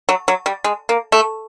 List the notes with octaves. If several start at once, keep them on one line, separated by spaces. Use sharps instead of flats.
F#3
F#3
G3
G#3
A#3
A3